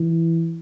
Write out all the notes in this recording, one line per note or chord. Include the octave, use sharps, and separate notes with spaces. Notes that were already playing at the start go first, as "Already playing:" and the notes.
Already playing: E3